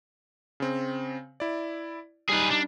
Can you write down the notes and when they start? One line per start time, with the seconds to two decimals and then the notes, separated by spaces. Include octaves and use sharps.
0.60 C#3 C4
1.40 E4 D5
2.29 G3 D#4 G#4 B4
2.51 D4